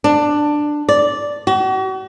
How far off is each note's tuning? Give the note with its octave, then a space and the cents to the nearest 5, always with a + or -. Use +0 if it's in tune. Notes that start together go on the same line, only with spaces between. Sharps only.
D4 +10
D5 -5
F#4 +40